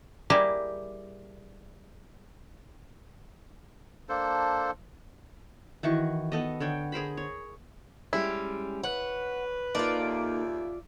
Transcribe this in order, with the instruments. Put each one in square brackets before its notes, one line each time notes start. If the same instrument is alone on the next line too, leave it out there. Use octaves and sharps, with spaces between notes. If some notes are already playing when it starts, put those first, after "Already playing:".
[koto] G3 A#3 E4 G4 G#4
[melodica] A#3 D4 A4 C5
[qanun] D#3 E3 F#4 C#6
B3 A4 D#5
D3 C#5 G5
G#4 A#4 C5 B5
C#5
[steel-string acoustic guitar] G3 G#3 C#4 [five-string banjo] E4
[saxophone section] B4 [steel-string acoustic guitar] C#5 [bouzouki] F#5
[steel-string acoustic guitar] A#3 D#4 A4 [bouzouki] F4 D5
[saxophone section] D#2 C#3 E5